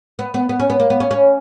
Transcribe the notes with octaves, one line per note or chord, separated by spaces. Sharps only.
B3
B3
B3
C#4
B3
A#3
B3
C#4
C#4